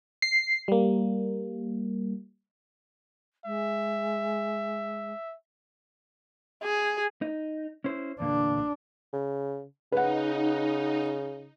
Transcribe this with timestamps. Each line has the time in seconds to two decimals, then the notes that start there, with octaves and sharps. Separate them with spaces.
0.22 C7
0.68 G3 A#3
3.45 G#3 E5
6.63 G#4
7.22 D#4
7.84 C#4 E4 C5
8.20 E2 A#2 D3 D4
9.13 C#3
9.92 C#3 D#4 B4 F#5